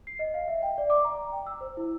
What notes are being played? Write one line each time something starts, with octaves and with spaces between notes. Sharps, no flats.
C7
D#5
F5
E5
G5
D5
D6
A#5
G5
E6
C5
E4